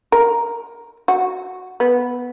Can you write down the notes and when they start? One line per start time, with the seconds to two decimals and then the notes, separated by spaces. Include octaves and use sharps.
0.12 A#4
1.08 F#4
1.80 B3